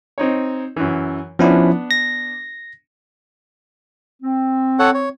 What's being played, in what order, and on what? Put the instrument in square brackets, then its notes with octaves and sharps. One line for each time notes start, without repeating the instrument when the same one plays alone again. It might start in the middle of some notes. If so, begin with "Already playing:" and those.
[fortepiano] C4 D#4 C#5
F#2 E3
[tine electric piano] F3 C#4 E4 [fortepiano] B3 D4
[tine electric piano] A#6
[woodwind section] C4
[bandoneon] A4 C#5 F#5
C#5